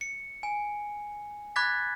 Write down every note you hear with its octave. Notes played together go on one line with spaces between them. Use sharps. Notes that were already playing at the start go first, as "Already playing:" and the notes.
C#7
G#5
B5 D6 F#6 G#6 A6 B6